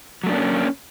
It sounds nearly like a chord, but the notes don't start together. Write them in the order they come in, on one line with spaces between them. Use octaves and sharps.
F#3 A3 D4 A#3 C#4